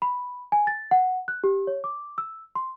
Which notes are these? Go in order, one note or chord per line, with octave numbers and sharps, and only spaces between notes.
B5
G#5
A6
F#5
F#6
G4
C#5
D6
E6
C6